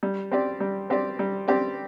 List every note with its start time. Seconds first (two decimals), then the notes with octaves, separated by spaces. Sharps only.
0.03 G3
0.32 C4 G4 D5
0.60 G3
0.90 C4 G4 D5
1.19 G3
1.48 C4 G4 D5